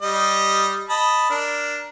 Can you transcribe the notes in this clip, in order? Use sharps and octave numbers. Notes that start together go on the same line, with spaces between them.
G3 D#5
D#5 A5 B5
D4 A#4